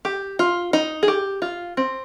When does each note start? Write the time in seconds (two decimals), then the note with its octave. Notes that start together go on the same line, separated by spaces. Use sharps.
0.05 G4
0.39 F4
0.73 D#4
1.03 G#4
1.08 G4
1.42 F4
1.77 C4